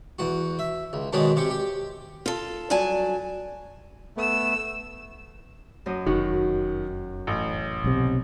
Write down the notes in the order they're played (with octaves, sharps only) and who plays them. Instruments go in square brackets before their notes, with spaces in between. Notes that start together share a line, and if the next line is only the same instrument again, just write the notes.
[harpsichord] E2 F#4
E5
C#2
G#2 B2 D#3 G#3 C#4 D4
C3 G4 C#6
G4
[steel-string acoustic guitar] F4 A4
G2 F#3 D5 G#5 A5
[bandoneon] A3 B3 [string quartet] E6
[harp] F#2 D#5
[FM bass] F1 [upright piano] D#3 [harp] F#4
[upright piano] A1
[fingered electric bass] B1 C3